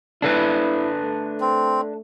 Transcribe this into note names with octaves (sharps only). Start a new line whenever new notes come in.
D4 E4 A4 B4
A3
C4